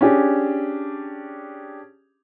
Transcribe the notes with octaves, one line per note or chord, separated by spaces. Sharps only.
C#4 D4 G4 G#4